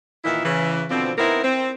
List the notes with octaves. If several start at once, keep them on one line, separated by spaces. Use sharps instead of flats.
A#2 D#3 E3 E4
C#3 E3
B2 D3 F3 C4
B3 C4 D#4 E4 A#4
C4